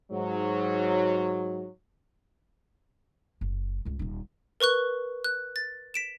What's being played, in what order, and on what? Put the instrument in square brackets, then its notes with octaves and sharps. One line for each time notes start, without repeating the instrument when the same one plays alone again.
[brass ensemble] G#2 F#3
[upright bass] F#1
C#2 G#2
D#1 D#4
[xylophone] A#4 B4 C#6 F#6
F#6
A6
B6 D7 E7